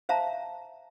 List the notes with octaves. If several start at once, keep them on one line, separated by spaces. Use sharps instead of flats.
C5 E5 F5 A5 A#5